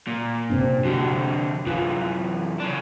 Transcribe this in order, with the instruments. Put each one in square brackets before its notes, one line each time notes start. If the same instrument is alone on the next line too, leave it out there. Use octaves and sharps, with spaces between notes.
[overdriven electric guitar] A#2
[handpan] C3 C4 D4
[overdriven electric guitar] F2 D3 [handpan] D4 F#4
[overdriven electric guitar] F#2 E3 [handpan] F4
[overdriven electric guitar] C#3 D4